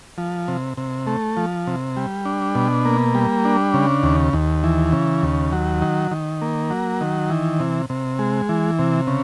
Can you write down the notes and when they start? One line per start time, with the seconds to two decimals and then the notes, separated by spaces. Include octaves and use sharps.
0.18 F3
0.48 C3
0.77 C3
1.07 A3
1.37 F3
1.67 C3
1.97 G3
2.25 D4
2.55 B2
2.85 A#3
3.15 G3
3.45 D4
3.74 C#3
4.03 D#2
4.33 D#2
4.64 E3
4.93 C#3
5.23 D#2
5.52 F#3
5.82 D#3
6.11 D#3
6.42 A#3
6.70 F#3
7.01 D#3
7.30 E3
7.60 C3
7.90 C3
8.19 G#3
8.49 E3
8.79 C3
9.07 C#3